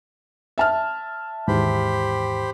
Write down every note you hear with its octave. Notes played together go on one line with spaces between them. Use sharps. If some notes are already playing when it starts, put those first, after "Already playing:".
E5 A5 F6
D#2 G#2 E3 G4 C5 B5